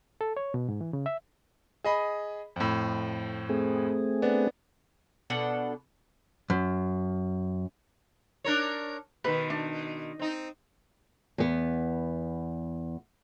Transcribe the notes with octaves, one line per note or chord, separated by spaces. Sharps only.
A4
C#5
B2
G#2
E3
C#3
E5
G#4 D#5 B5
F2 A2
A3 C4 G#4
B3 D4
B2 D4 A4 F#5
F#2
D4 A#4 C#5
B2 D#3 B4
D4
C4 D#4
E2 B3